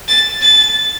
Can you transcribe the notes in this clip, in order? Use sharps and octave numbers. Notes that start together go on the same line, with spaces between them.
A6
A6